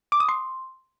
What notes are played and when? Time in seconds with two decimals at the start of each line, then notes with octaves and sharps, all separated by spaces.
0.12 D6
0.20 D#6
0.29 C6